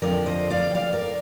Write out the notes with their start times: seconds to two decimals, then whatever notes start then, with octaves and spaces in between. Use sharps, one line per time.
0.02 F2 D3 F3 A#4 D5
0.26 C5 D#5
0.50 D5 F5
0.70 G5
0.75 D5 F5
0.93 A#4 D5